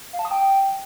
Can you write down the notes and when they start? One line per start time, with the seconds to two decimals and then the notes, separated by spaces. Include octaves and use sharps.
0.13 F5
0.19 A5
0.25 D#6
0.31 G5